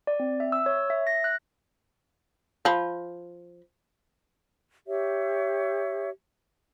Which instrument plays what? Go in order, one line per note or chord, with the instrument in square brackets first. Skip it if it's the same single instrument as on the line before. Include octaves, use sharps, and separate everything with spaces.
[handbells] D5
C4
E5
E6
C#5
E5
A#6
F#6
[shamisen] F3 B5
[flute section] G4 C#5 E5